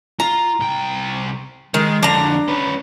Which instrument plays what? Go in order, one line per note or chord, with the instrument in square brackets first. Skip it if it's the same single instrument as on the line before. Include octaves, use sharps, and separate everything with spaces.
[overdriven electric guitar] F4 [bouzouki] A#5
[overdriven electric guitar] C2 G5
[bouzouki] D#3 [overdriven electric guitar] G#3
[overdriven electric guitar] F2 D3 [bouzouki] D4 A#5
[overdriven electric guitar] C#4 B4